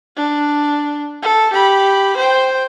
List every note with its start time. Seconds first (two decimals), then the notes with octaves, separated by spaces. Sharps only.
0.16 D4
1.22 A4
1.53 G4 B5
2.16 C5 G5